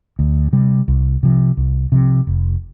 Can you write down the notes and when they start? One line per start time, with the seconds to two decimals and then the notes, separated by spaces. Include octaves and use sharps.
0.19 D2
0.53 C3 G3
0.88 C2
1.23 C3 F3
1.57 C2
1.92 C3 F3
2.27 F1